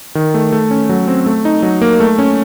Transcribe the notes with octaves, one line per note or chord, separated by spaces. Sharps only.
D#3
A3
A3
C#4
F#3
C4
A3
D#4
F#3
A#3
A3
C#4